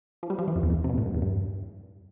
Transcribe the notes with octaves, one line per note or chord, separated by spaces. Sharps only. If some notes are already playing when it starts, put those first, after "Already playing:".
F3
G3
F3
E3
F2
E2
F2
C3
B2
A2
G2
E2
G2